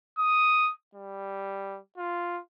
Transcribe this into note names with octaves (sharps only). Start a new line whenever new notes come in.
D#6
G3
F4